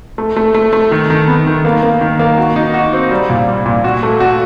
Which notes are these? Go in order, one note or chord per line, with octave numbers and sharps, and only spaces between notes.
A3
A3
A3
A3
D#3
D#3
B3
D#3
A#3
A#3
D#3
A#3
F#4
D#4
F#4
C4
G3
A#2
G3
A#2
F#4
A3
F#4